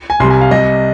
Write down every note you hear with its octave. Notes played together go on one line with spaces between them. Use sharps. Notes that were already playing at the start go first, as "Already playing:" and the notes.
G#5
C2 C3 G3 C6
G#5
F5
C2 C3 G3 D#5